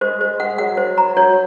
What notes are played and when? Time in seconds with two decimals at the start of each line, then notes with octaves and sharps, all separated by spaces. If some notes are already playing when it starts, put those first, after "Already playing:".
0.01 G#3 C5
0.20 G#3 C5
0.39 G#3 F#5
0.58 F#3 F#5
0.77 C5
0.98 A#5
1.17 F#3 C#5